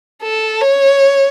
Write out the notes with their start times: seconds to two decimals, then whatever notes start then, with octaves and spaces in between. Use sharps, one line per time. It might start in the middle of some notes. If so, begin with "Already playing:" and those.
0.22 A4
0.62 C#5